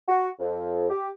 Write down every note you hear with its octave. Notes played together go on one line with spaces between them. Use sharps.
F#4
F2
G4